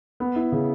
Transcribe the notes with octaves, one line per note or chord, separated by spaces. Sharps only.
B3
E4
C#3